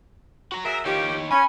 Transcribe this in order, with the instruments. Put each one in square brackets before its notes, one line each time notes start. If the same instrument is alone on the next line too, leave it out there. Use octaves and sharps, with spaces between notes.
[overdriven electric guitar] F#4 A#5
[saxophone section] F#3 G#4 E5 [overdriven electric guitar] A#4
[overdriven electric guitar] D#3 C#5 [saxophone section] F3 A#3 G4
[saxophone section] C#4 [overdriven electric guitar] G#5 [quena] B5